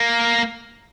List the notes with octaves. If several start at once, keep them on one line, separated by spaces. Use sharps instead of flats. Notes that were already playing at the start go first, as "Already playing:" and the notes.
Already playing: A#3